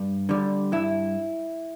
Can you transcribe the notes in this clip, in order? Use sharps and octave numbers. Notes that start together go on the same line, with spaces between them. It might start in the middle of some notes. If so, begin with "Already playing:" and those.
Already playing: G2
D3 G3
G2 E4